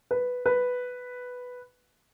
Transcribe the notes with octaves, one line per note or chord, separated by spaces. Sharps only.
B4
B4